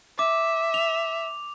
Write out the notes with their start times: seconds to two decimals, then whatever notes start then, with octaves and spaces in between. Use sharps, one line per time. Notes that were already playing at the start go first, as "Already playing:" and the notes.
0.19 E5 D6
0.74 F7